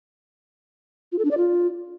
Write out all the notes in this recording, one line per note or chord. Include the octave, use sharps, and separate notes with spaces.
F4
A4
D4
D5
F4